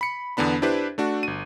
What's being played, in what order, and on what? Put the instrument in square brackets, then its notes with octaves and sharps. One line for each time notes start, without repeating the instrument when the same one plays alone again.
[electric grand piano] B5 C#7
E2 D3 B3 D4 B5
D4 E4 G4 B4 C5
A3 D4 F#4
G1 D#7